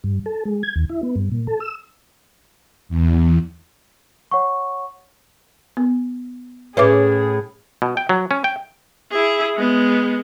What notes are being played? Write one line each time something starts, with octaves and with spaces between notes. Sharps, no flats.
G2
A4
G#3
G#6
D#2
E4
B3
G2
A#2
A4
E6
E2
C#5 F#5 C#6
B3
A2 C#4 G#4 B4 E5 D6
B2
G5
F#3
C#4
G5
E4 G#4
G#3 B3